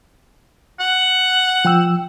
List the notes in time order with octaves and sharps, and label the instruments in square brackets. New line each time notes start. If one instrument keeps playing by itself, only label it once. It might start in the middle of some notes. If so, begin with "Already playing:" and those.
[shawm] F#5
[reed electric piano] F3 G5 E6